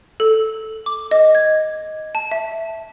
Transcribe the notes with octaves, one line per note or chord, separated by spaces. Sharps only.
A4
D6
D#5
G#6
A5
E5